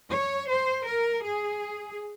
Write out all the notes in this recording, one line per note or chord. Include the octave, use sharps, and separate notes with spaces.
C#5
C5
A#4
G#4